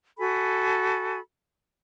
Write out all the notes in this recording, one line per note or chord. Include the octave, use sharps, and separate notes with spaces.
F#4 A4 G#5 B5